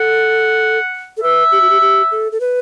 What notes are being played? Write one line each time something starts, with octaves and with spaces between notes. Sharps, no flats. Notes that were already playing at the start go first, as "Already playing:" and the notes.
Already playing: A4 F#5
A4
B4 E5
G4
F#4
G4
G4
A4
A4
B4